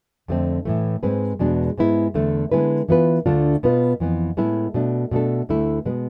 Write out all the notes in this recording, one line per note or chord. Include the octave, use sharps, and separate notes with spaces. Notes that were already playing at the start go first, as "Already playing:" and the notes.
F2 D3 A3 C4
A2 E3 A3
G#2 G#3 C4 G#4 B4
E2 B2 G#3 D4
G#2 G#3 B3 E4
E2 D3 A3
D3 G#3 B3 E4 B4
E3 B3 F4 B4
D2 D3 A3 D4 F4
B2 B3 F4 B4
F2 E3 B3
A2 G#3 B3 E4
B2 A3 D4
B2 A3 D4 A4
D2 D3 A3 E4
B2 G#3 B3